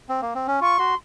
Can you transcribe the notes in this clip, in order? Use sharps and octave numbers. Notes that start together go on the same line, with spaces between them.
C4
A#3
C4
C#4
F4 C#6
F#4 C6